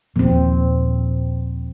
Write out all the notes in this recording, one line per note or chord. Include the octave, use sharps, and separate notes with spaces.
D#1 G#1 A#2 F3 C4